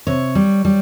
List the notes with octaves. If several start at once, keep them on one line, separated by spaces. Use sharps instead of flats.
C3 C#5
G3
G3